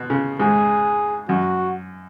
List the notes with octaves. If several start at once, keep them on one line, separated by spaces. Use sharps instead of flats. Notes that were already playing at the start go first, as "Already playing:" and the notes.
Already playing: B2
C#3
G#2 G#4
F#2 F#4